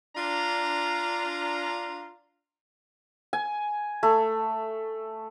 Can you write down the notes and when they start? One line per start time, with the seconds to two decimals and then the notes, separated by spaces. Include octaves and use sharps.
0.17 D4 F4 A#5
3.33 G#5
4.03 A3